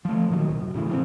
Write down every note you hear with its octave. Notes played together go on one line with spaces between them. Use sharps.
F3 A3
A#2 D#3 F#3
E1 C2
F#2
A2 C#3 E3
F3 F#3 C4